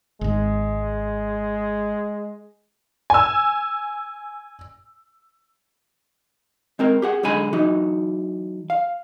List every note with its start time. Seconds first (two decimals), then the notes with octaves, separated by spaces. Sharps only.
0.21 G#1 G#2 G#3
3.10 G#5 E6
6.79 G#3 C4 A#4
7.02 G4 G#4 F#5
7.23 B1 D3 G#3 G#5 B5
7.53 E3 F#3 D#4
8.70 F5